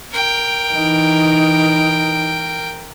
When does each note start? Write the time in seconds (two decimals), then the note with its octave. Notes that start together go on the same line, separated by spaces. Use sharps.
0.11 A#4 G5
0.71 E3 D#4